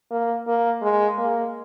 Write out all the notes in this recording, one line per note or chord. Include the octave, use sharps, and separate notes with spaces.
A#3
A#3
G#3
A#3